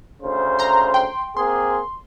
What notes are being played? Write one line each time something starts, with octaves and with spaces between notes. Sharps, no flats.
D2 C#3 C5
A#5 C6
G5 C6
A#3 C4 G#4 C6